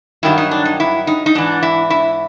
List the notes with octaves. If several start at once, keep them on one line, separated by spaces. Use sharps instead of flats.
G2 D#3 F#3 E4
D#4
D4
D#4
E4
D#4
D#4
G#2 E3 D4
E4
E4